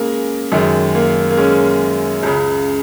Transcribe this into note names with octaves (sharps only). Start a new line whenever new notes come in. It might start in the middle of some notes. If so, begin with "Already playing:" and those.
Already playing: C#3 G#3 A#3
F#2 D#3 G#3
A#3
A#3
G#3 C#4
C#2 C#3